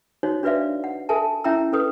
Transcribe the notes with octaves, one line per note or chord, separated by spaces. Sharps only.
D#4 F#4 C5 C#5
D4 F#4 B4 D5 E5 F5
F#5
A4 A#4 E5 G#5 A5
C#4 E4 E5 G5 A#5 E6
C#4 A4 B4 D#6